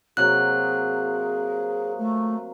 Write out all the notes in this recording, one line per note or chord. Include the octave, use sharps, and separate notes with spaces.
C3 F#3 A#3 G#4 F#6
A3